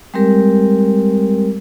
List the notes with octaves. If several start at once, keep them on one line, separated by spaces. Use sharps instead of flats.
G3 G#3 C4 G4 A#4